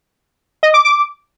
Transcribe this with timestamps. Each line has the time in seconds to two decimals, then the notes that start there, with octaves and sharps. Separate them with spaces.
0.63 D#5
0.74 D6
0.85 D6